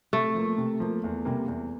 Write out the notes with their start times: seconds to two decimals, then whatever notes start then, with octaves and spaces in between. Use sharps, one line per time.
0.13 C3 A3
0.35 F3 A#3
0.58 C3
0.80 F3 A#3
1.04 E2
1.25 C3 G3 A#3
1.48 E2